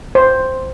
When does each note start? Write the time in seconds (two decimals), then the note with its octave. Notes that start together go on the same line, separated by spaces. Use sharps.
0.15 C5